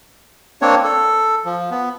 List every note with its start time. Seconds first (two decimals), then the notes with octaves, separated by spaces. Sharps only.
0.62 A#3 C4 D4 C#5
0.84 A4
1.45 F3
1.71 B3